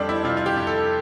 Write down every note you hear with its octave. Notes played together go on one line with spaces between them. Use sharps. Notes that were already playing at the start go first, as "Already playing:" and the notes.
Already playing: F2 G3 D4 A4 C5
E4
C3 F4
F4
G4
F2
A4